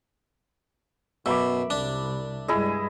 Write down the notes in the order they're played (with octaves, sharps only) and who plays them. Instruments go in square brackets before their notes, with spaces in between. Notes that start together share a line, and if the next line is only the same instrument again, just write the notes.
[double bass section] F#2 [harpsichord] B2 [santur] E5 B5 D6
[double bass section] C2 [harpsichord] D4
[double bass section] G2 G3 G#3 [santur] E4 G#4 D#5